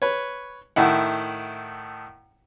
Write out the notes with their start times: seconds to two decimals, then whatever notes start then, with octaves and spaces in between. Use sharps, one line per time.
0.02 B4 C#5
0.76 A2 D#3 E4 F#5